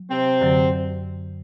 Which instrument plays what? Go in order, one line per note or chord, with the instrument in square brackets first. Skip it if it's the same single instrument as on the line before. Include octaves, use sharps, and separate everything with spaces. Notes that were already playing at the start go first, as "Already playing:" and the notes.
Already playing: [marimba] F#3
[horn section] C3 C4
[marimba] F#2 D3 F#3